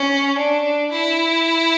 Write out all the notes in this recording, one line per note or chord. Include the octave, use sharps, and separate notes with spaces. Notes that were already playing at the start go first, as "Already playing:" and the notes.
Already playing: C#4
D4
E4